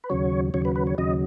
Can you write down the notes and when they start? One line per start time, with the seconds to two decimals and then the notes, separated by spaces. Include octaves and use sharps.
0.04 B4
0.10 D#2 C#3 F#3 C#5
0.54 D#2 C#3 F#3 C#5
0.65 B4
0.76 B4
0.87 C#5
0.98 D#2 C#3 F#3 D#5